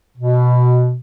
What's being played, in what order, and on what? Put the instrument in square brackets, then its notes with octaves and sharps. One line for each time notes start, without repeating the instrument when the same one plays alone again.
[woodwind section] B2